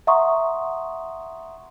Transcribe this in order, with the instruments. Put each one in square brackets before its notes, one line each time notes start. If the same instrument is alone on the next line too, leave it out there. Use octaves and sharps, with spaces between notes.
[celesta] E5 F#5 A#5 C6 C#6 D#6